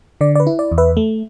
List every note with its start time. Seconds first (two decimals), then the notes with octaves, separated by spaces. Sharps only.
0.21 D3 D5
0.35 D5
0.40 B4
0.47 E4
0.59 D5
0.72 E2
0.78 B4 E5
0.97 A3